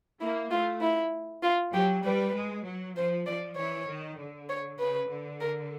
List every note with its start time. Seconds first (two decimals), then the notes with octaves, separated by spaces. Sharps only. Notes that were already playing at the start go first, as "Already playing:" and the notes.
0.21 A#3 E4
0.51 A3 F4
0.81 E4
1.43 F4
1.73 F#3 G4
2.03 G3 B4
2.35 G#3
2.65 F#3
2.96 F3 C5
3.27 F3 D5
3.57 E3 C#5
3.87 D#3
4.18 D3
4.49 C#5
4.79 C#3 B4
5.10 D3
5.40 A#4